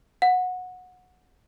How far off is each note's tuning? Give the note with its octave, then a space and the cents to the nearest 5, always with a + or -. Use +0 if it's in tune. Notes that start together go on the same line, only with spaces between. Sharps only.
F#5 -15